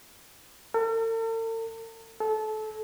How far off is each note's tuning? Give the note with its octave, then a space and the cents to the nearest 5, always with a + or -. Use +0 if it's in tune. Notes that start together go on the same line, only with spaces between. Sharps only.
A4 +45
A4 -25